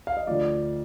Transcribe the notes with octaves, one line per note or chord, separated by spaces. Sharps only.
F5
D#5
D2 D3 F3 A3 D5